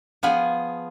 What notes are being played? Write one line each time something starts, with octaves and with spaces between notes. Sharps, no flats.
F3 B3 F4 G#4